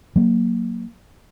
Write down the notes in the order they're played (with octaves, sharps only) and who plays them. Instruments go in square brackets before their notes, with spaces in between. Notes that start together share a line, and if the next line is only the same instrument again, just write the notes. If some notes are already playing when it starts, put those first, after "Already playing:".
[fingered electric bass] F#3 A#3